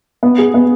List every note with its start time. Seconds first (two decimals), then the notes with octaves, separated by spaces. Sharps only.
0.23 B3
0.38 G#4
0.54 B3